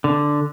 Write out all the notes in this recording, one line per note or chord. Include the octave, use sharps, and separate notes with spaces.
D3